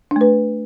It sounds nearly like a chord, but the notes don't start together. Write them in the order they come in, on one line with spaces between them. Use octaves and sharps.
D4 A3 B4